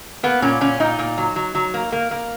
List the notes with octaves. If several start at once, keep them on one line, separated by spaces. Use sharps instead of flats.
A#3 B3
A#2 C#4
A#2 C#4
A#2 D#4
A#2
F#3
F#3
F#3
A#3
A#3
A#3